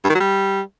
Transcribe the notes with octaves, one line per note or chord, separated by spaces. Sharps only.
G2
D#3
F#3
G3